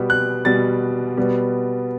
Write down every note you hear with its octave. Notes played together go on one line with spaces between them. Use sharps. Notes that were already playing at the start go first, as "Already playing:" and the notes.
Already playing: B2 G3 B3
F#6
B2 G3 B3 A6
B2 G3 B3